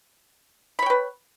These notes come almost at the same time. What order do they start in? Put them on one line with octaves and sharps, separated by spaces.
B5 C#5 G5 B4